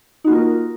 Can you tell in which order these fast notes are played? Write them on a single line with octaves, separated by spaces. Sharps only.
D#4 F#4 A#3 F4 A#4